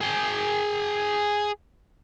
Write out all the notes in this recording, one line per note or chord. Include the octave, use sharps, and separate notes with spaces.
G#4 G5